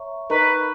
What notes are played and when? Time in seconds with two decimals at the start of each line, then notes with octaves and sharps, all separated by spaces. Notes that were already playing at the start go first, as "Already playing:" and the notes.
Already playing: C#5 E5 A#5 C#6
0.30 D#4 A#4 B4 D#5 A#5 C#6